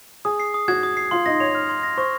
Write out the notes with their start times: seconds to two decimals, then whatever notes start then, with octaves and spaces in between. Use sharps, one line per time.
0.25 G#4 D#6
0.40 C7
0.54 D#6
0.68 F#4 G#6
0.83 D#6
0.97 C7
1.11 F4 C6
1.26 D#4 A#6
1.40 C#5 F7
1.55 F6
1.69 C6
1.83 A#6
1.97 C5 C#6